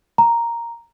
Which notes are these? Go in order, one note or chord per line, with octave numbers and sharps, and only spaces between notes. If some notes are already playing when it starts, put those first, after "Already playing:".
A#5